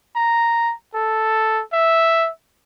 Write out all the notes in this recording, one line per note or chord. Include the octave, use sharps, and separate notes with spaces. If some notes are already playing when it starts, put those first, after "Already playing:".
A#5
A4
E5